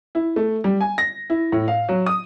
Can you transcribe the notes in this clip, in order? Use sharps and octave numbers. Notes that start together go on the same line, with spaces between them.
E4
A3
G3
G#5
A#6
E4
A2
F5
F#3
D#6